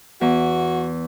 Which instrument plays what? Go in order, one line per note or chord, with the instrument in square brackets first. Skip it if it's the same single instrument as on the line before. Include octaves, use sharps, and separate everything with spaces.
[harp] E2 [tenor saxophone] F#4